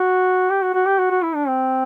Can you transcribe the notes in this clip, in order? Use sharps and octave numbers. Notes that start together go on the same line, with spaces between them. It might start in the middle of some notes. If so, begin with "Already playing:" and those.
Already playing: F#4
G4
F#4
F#4
G4
F#4
F#4
E4
D4
C4